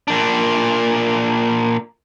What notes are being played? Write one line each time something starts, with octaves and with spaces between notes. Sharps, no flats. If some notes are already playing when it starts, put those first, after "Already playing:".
A#2 D4